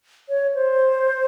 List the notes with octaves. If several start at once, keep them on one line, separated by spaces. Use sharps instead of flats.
C#5
C5